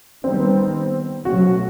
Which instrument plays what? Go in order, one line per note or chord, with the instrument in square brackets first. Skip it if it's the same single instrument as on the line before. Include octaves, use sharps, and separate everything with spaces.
[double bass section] D#3 G3 B3 [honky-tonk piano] C4
[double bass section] B2 F#3 A3 C#4 [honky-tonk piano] F#4